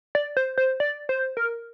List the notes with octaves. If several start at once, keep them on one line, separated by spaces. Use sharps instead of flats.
D5
C5
C5
D5
C5
A#4